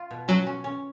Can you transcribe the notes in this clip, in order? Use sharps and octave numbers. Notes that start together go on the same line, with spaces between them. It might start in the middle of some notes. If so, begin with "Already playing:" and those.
Already playing: F4
B2
F#3 C#4
C#4
C#4